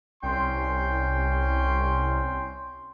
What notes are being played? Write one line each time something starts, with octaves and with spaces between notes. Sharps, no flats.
C2 C#4 G5 C6